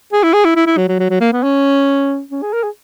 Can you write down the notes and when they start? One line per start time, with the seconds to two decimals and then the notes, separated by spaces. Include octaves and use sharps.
0.13 G#4
0.23 E4
0.34 G#4
0.45 E4
0.56 E4
0.67 E4
0.77 F#3
0.88 F#3
0.99 F#3
1.10 F#3
1.21 A#3
1.32 B3
1.43 C#4
2.31 C#4
2.42 G#4
2.53 A#4
2.64 G#4